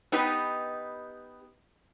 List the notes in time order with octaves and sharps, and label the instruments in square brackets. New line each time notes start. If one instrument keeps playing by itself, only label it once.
[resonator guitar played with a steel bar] B3 D#4 G4 B4 D#5